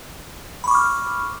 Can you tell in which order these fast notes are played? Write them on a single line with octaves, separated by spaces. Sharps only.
B5 C#6 D6 F6